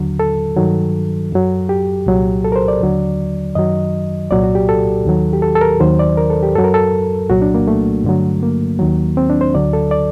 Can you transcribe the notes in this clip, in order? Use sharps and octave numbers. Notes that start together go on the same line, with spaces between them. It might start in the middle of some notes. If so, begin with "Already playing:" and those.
Already playing: D#2 D3 F#3
A4
G2 D#3 F#3
F#2 F#3
G4
C2 A#2 F#3
A4
A#4
C5
D5
D#2 D3 F#3
F#2 D#3 F#3 D#5
C2 A#2 F#3 D5
F#4
G4
A4
D#2 D#3 F#3
G4
A4
A4
A#4
D#2 D#3 F#3 C5
D5
A#4
A4
G4
F#2 F#3 A4
A#4
A4
C2 A#2 F#3 F#4
D4
A#3
A3
G2 D3 F#3
A#3
D#2 D#3 F#3
C4
D4
C5
D2 D3 F#3 D5
A4
D5